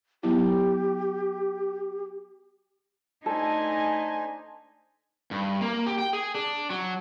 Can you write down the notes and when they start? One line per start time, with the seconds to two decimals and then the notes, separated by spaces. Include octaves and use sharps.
0.23 F#3 B3 E4 G4
3.26 A3 D4 D#4 A4 C5 G#5
5.31 G2
5.61 A#3
5.86 G4
5.98 G5
6.13 G#4
6.35 D4
6.70 F#3